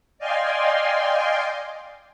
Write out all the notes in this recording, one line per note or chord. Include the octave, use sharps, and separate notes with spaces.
D5 D#5 F5 G5 G#5 C6